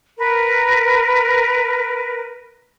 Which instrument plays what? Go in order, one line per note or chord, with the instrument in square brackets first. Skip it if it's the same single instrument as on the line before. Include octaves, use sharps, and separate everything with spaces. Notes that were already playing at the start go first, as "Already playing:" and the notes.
[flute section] A#4 B4